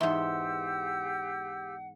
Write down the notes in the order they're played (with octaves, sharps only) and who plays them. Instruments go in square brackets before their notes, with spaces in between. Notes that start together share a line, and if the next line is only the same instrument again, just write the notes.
[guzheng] E2 G#2 [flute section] G4 E6 G6 [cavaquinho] E5 C6 [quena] F#5